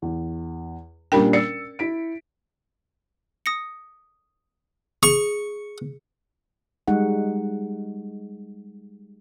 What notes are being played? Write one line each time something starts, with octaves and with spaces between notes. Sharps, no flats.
E2
A#2 G3 C#4 D4 A#4 G5
D5 E6 A6 C#7
E4 B6 D7
D#6 A#6 C#7
G#4 C#6
G3 G#3 D#4 F#5